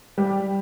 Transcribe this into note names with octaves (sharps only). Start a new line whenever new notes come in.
G3